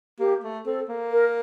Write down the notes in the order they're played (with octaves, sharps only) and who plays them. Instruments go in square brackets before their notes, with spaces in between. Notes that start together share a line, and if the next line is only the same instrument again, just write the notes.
[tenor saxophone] A#3 [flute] G4
[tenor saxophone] A3
[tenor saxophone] C4 [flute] A4
[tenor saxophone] A#3
[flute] A#4